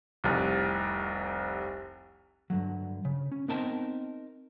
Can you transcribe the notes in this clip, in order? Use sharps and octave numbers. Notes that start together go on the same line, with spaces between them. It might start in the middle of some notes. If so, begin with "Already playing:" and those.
F1 C2
G2 D3 F3 F#3
C#3
C#4
B3 C4 D#4 A#4 G5 A5